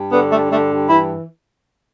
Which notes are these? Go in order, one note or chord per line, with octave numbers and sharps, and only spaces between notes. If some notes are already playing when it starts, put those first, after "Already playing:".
Already playing: G2
D3 B3
G2 A3
D3 A3
G2
E3 E4